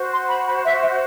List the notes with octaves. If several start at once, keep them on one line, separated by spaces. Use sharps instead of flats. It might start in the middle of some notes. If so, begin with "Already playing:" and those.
Already playing: F#4 C5
C6
B5
B5
E5
E5